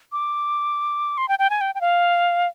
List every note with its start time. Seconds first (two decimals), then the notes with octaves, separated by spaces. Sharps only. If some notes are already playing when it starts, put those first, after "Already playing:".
0.12 D6
1.18 C6
1.29 G5
1.39 G5
1.50 G#5
1.61 G5
1.75 G5
1.81 F5